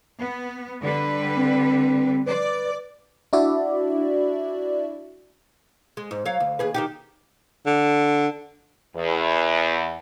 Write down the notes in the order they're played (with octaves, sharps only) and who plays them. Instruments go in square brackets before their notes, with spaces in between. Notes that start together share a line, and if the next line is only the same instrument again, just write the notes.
[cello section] B3
D3 G3 B4
[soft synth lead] C4
[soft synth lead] B4 [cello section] D5
[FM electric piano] D4 E4 F#4 D5 E5
[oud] G#3
G#2
F#3 C#5 F5
D2
D#2 G#4 B4
D#3 D#4 G4
[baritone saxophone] D3
[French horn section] E2